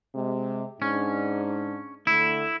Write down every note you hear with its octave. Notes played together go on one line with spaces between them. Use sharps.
C3 G#3
G#2 C#4 D4
D3 A3 E4